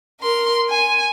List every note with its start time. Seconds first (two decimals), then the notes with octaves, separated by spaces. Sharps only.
0.21 A#4 C6
0.70 G#5